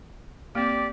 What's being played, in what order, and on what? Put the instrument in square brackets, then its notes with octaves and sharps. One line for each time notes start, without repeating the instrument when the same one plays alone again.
[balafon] A#3 C4 [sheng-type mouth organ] G4 [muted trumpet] D5